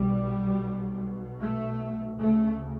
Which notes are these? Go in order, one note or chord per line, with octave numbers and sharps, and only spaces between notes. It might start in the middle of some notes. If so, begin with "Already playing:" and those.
Already playing: B1 B2 G3
A3
D2 C#3 A3